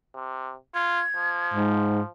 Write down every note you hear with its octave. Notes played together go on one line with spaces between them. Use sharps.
C3
F4 G#6
F3
G#2